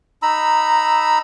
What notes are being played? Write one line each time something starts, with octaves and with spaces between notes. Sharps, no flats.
D#4 A#5 B5 E6